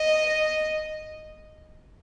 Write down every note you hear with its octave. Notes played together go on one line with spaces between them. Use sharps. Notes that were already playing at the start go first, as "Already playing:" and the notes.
Already playing: D#5